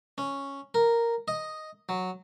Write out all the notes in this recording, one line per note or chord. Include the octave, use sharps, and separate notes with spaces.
C#4
A#4
D#5
F#3